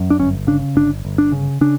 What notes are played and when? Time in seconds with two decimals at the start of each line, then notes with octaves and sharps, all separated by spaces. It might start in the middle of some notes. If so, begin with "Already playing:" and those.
Already playing: F#2
0.10 D4
0.19 G1 C#4
0.47 C#3 D4
0.76 G1 D4
1.05 G1
1.18 D4
1.32 C#3
1.61 C#3 D4